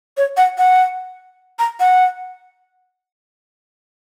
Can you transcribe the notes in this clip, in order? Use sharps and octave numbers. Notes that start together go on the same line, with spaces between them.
C#5
F#5
F#5
A#5
F#5